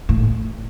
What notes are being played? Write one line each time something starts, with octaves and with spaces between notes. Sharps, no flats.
A2